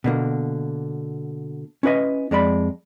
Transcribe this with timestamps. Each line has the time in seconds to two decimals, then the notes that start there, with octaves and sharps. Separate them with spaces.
0.04 B2 D3 A#3
1.83 C#4 E4 B4 D#5
2.31 F2 G#3 D5 B5